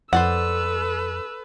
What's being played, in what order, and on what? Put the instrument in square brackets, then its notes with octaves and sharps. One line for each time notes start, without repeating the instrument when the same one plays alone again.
[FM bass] F2 [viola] A4 B4 [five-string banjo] C5 D5 F#5 [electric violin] E6